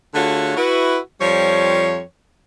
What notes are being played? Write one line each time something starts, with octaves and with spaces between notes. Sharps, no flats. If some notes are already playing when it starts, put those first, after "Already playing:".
D3 A3 F4 F#4 G#4 C#5
E4 F#4 B4
F2 F3 G3 C#5